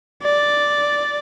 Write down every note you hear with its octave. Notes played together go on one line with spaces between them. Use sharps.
D5